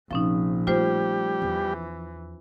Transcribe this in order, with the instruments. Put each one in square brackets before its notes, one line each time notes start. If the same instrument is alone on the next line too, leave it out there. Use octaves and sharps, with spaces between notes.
[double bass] A#1 [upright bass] C3 [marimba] F3 C#4 D#4
[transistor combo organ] G3 G4 [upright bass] A3 [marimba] F4 C5
[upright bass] E2 [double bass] E3